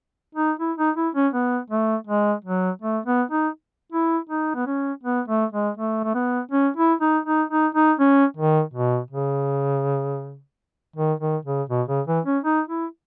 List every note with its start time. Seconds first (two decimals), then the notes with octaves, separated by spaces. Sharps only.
0.35 D#4
0.60 E4
0.78 D#4
0.96 E4
1.15 C#4
1.34 B3
1.70 A3
2.07 G#3
2.45 F#3
2.82 A3
3.06 B3
3.31 D#4
3.92 E4
4.30 D#4
4.55 B3
4.67 C#4
5.04 B3
5.28 A3
5.53 G#3
5.77 A3
6.04 A3
6.15 B3
6.52 C#4
6.77 E4
7.01 D#4
7.26 D#4
7.50 D#4
7.75 D#4
8.00 C#4
8.37 D#3
8.74 B2
9.11 C#3
10.96 D#3
11.20 D#3
11.46 C#3
11.70 B2
11.89 C#3
12.07 E3
12.26 C#4
12.44 D#4
12.69 E4